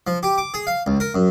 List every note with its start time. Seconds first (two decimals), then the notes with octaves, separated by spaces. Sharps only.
0.07 F3
0.23 G4
0.38 D6
0.54 G#4
0.67 F5
0.87 C#2
1.00 A#4
1.14 F#2